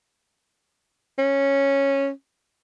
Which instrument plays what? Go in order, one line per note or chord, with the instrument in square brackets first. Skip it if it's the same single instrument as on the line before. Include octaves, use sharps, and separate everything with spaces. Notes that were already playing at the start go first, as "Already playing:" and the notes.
[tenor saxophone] C#4